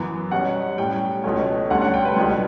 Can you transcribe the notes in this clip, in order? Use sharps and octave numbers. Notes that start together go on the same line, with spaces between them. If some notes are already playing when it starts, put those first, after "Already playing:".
Already playing: F#2 E3 B3
B2 G3 C#4 F#5
A2 G3 C#4 G5
C#2 B2 A3 C#4
D2 D3 G3 C#4 F#5
F#5
G5
B4
C#2 B2 G3